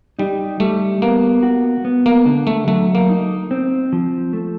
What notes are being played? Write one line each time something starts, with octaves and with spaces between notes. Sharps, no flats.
G3 D#4
G3 A3
A#3 B3
F#4
B3
A#3
D3
A3
F#3 A3
A#3
D#4
C4
F3
A3